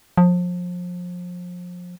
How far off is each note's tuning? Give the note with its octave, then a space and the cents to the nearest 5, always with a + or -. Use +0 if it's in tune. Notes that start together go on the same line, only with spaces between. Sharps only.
F3 +30